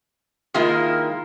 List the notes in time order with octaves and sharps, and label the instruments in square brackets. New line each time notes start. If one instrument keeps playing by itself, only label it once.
[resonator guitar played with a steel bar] D#3 G#3 A#3 E4 F4